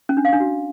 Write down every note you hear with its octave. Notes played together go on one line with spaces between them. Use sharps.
C#4
D4
F5
D4
F#4